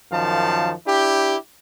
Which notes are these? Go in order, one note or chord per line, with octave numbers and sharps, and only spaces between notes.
F#2 D#3 F3 F5 A5
D4 E4 G4